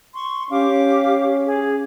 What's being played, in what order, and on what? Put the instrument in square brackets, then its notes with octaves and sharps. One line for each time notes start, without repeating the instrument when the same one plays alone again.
[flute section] C6 C#6
[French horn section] C#4 [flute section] G4 F5 D6
[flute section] G#4